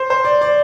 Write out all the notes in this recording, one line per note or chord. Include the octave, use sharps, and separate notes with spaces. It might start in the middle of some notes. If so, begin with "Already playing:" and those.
Already playing: C5
C5
D5
D5